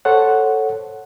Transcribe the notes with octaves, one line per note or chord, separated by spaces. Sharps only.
A4 C5 C#5 F#5